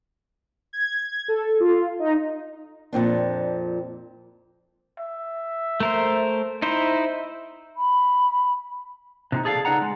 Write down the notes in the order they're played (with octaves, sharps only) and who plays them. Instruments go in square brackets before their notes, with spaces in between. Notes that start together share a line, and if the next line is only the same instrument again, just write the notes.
[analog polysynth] G#6
A4
F4
D#4
[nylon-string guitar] F2 A#2 C4 D4
[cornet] E5
[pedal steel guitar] A3 A#4 C5
[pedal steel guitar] D#4 E4 C5 [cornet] E5
[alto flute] B5
[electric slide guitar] C3 F3 D#4
G#4 A4 D5 F5
C#3 D#4 B4 D5 F#5 A#5
G#3